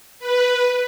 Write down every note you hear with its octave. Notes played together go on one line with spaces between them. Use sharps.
B4